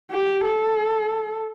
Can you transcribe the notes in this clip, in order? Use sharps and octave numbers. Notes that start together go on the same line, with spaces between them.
G4
A4